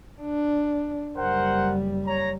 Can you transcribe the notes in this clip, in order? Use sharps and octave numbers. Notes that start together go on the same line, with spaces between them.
D4
F#1 G3 A#4 C5 F#5
C#5 A#5